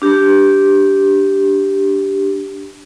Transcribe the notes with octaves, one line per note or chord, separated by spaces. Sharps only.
D4 G4